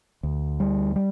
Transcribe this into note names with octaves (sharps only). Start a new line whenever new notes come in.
D2
G3
G3